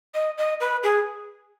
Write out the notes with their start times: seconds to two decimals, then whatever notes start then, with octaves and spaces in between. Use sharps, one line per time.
0.14 D#5
0.38 D#5
0.60 B4
0.83 G#4